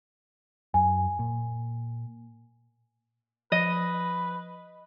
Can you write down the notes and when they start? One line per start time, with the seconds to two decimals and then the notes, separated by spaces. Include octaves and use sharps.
0.74 F#2 G#5
1.19 A#2
3.52 F3 B4 D#5